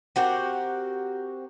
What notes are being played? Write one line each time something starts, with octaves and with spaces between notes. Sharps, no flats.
C4 F#4 G4 A#4